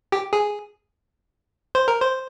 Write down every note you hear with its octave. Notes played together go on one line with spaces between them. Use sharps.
G4
G#4
C5
A#4
C5